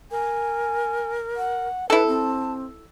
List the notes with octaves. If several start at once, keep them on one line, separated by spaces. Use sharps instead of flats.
A#4 G#5
F#5
E4 A4 B4 A5
C4